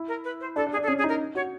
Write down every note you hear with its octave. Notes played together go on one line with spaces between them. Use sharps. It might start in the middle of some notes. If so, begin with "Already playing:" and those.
Already playing: E4
A#4
B4
C5
D4 A4
D4
G#4
D4
A4
C#4 G#4
G#4
D#4
A#4
F#4 C#5